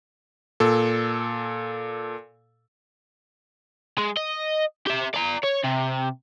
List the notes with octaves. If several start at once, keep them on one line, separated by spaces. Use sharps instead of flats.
A#2 A4
G#3
D#5
G4 E5
D5 A#5
C#5
C3